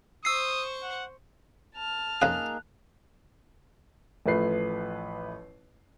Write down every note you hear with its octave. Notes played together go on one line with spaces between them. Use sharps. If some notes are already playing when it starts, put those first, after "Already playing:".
C5 C#6 D#6 E6 C7
F#5
A5 F6
F2 C#3 A#3 D#4 G#4 F5 F#6
A1 F3 A3 B4 C7